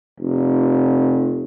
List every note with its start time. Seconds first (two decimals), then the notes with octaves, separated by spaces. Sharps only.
0.20 F1